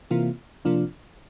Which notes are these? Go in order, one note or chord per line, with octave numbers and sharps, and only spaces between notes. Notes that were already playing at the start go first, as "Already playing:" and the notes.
C3 E3 A#3 F4
C3 F3 A#3 D4 F4